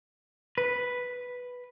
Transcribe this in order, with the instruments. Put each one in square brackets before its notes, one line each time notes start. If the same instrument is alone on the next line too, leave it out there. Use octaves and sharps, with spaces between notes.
[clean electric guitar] B4